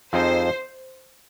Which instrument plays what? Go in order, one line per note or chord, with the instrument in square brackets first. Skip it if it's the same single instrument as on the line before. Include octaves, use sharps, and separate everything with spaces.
[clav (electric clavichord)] F2 F3 C4 D#4 G#4 [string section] C5